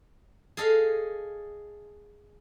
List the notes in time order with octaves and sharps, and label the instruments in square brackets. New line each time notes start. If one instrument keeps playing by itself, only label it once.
[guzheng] G#4 A4 D#5 F5